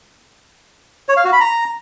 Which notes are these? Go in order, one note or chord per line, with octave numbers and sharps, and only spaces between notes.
C#5
F5
F#4
B5
A#5